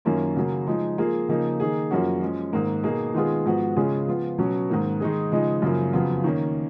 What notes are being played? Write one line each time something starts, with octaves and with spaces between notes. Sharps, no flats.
F#2 D#3 A#3 C#4 F4
C#3 F#3 A#3
F3 G#3 D#4
F3 A#3 F4 G#4
C#3 F3 A#3 D#4
D#3 A#3 D#4 G#4
F#2 F3 A#3 C#4 F#4
F3 G#3 C#4
G#2 D#3 A#3
B2 A#3 D#4 G#4
D#3 G#3 B3 F4 G#4
G#2 F3 B3 F#4
C#3 G#3 C#4 F4 G#4
F3 B3 F4
B2 F#3 C#4
G#2 D#3 A#3
D#3 G#3 D#4 G#4
C#3 F3 G#3 D#4
F#2 C#3 F3 A#3
F2 C#3 F#3 B3 F4
D#3 A#3 C#4